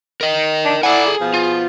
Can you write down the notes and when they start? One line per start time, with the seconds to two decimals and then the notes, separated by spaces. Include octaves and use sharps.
0.21 A#4 D#5
0.65 D4
0.83 E4 A4 D5 F#5 G#5
1.07 G#4
1.21 B2 F3 B3
1.34 F4